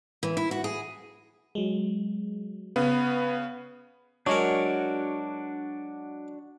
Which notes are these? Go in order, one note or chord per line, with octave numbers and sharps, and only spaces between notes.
E3
E4
F#4
G#4
F#3 G#3
C#3 B3
F#3 G#3 D4 F#4 A#4